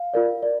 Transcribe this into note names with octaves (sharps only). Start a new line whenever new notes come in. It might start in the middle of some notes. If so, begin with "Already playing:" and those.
Already playing: F5
F4 A#4 D5
A#4 D5